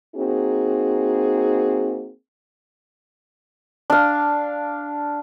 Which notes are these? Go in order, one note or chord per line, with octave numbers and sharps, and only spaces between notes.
A#3 C4 D#4 F#4 G#4
D4 F5